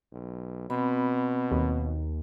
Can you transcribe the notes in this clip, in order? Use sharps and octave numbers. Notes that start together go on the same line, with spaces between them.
B1
B2 C4 B5
D#2